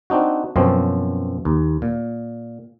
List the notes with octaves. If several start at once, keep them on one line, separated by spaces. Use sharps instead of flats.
C4 D4 D#4 F#4
F#2 B2 F3 C4 C#4
D#2
A#2